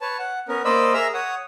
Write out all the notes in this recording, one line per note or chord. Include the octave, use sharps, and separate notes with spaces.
B4 C#5 A5
F#5
B3 C#4 A#4
A#3 C5 D5 D#5 B5 E6
G#4 A#4 E5 A#5 E6
C#5 F#5 D#6